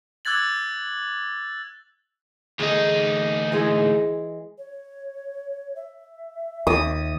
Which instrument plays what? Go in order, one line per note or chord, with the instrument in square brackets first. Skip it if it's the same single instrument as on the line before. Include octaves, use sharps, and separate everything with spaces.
[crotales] D6 E6 F#6 G#6 A6 F#7
[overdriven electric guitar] D2 D#4 [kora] A3 G#4
[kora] E3 G#3 G#4
[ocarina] C#5
E5
[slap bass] D#2 [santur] D#6